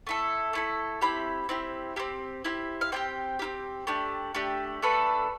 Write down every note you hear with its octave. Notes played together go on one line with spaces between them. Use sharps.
A3 E4 A4
A3 E4 A4
C4 E4 G4 B5
C4 E4 G4
C4 E4 G4
C4 E4 G4
F5
C4 E4 G4 G5
C4 E4 G4
A3 D4 G4
A3 D4 G4
A3 D4 A4 B4